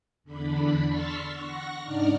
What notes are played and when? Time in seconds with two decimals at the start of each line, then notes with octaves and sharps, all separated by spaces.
0.24 E2 D3 D4 B5
0.86 C6 C#6 E6 F6 A6 B6
1.33 F#5 C#6 A#6
1.81 G#2 C#3 D4 D#4 D5 F6